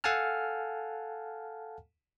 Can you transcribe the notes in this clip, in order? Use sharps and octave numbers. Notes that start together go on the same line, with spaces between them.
A4 F5 F#5 G#5 A5 F6